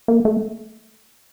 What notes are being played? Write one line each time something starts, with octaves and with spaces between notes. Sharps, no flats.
A#3
A3